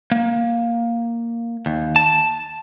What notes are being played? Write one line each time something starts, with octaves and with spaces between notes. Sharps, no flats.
A#3
D#2
A5